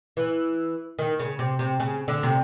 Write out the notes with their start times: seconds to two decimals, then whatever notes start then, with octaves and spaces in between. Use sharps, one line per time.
0.17 E3
0.99 D#3
1.20 C#3
1.39 C3
1.59 C3
1.80 C#3
2.08 D3
2.23 C3